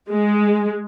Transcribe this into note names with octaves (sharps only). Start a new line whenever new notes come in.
G#3